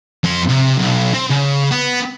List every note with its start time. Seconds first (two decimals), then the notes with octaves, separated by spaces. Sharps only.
0.24 F2 C6
0.49 C3
0.79 B1
1.14 C4
1.31 C#3
1.71 B3